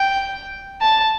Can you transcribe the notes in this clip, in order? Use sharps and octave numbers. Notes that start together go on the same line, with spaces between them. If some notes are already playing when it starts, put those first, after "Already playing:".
Already playing: G5
A5